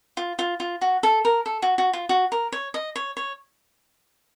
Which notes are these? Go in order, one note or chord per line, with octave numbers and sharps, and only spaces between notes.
F4
F4
F4
F#4
A4
A#4
A4
F#4
F#4
F4
F#4
A#4
C#5
D#5
C#5
C#5